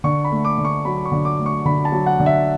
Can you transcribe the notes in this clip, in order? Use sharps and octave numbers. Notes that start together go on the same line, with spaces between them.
D3 C#6
B5
A3
D6
D3
C#6
F#3 B5
C#6
D3
D6
A3
C#6
D3 B5
A5
F#3
F#5
D3
E5